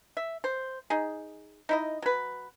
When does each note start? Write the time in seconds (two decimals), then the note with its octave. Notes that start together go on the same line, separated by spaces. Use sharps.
0.17 E5
0.44 C5
0.90 D#4 G#4
1.69 D#4 E4 D#5
2.02 F#3 B4